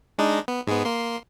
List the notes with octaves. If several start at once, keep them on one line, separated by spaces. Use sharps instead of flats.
G#3 D4 D#4
B3
G#2 G#3 B3
A#3 C6